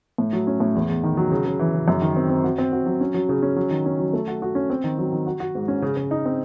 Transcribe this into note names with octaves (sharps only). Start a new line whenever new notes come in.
A2
F#3
C#4
A2
E2
E2
D#3
F#3
C#3
C#3
E3
C#3
F#2
D#3
C4
C4
F#4
C4
F#4
F#3
C#4
F#3
C#3
C#4
F#3
D#3
C#4
F#3
A3
F#4
F#4
C#4
C4
D#3
F#3
D#3
F#4
F#4
G#2
C#4
C#3
C#3
D#4
C4